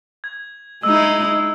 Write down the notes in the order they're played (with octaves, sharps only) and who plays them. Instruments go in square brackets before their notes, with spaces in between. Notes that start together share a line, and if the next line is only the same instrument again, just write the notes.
[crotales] G#6
[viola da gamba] G#3 D#4 E4 [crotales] E6